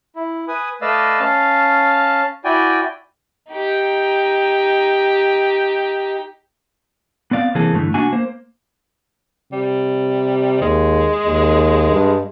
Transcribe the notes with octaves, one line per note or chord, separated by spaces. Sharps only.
E4
B4 G#5 D#6
A3 B4 D5 D#5 F5 E6
C#4 F5 A5
E4 F#4 D5 G5 G#5
D#4 G4
B3 C4 D5 F5
C2 E3 A#3 C4 G#4 A4
G2 D3 E3 A3
C2 A#3 D4 F#4 E5 G#5
A#3 C5
C3 G3
D#2 G#3
D#2
G2